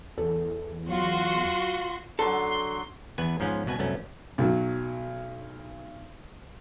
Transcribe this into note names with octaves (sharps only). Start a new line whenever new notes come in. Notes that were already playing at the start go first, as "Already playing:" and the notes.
E2 A4
F#3 F4 F#4 C6
D3 F#3 A4 C6
E2 B3 B4 G#5
G#2 F3 B3 C#4
C2 B2 B3 B4 G#5
C2 F#2 A3 B3 C#4
B1 F#3